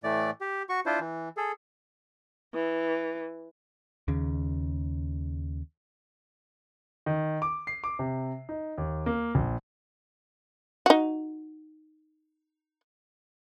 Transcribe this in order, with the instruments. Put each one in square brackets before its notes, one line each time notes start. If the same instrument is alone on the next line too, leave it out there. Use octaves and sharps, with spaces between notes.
[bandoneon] A2 E3 A3 D5
G4
F#4 C#6
D4 E4 F4 C5
E3
G#4 A4
[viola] E3
[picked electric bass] D#2 C#3
[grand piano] D#3
D6
C7
D6
C3
D#4
D#2
A#3
A#1
[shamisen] D#4 F#4